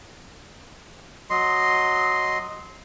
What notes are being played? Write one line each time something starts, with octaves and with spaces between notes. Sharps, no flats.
F#3 D#5 C6